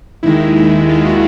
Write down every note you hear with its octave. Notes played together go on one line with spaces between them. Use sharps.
D#2 D#3 G#3 E4
E4
F4
F#4